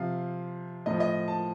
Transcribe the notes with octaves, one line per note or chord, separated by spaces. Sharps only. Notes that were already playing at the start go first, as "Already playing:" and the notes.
Already playing: C3 F3 F5
A2 F3 D#5
D#5
A5